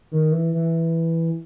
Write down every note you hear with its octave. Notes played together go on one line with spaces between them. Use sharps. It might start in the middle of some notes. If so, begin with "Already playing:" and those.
D#3
E3
E3